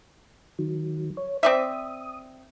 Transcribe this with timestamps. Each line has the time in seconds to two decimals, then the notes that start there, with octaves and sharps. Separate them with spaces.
0.59 D#3 F#3
1.17 C#5
1.43 C4 D5 E5 D#6